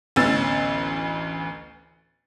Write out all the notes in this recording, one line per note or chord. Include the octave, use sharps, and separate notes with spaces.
A1 D2 B3 C#4 E6 A6